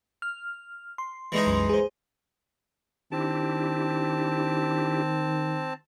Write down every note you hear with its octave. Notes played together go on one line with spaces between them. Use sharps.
F6
C6
E3 G#3 D#4
C2 F#2 C6
G#4 C5
D#3 C4 D4 E4 G4 A5